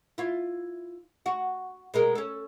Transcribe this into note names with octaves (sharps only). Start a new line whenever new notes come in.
E4 F4
F#4
B2 G#3 A#4
C#4 A4